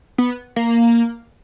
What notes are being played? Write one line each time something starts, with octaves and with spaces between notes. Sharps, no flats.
B3
A#3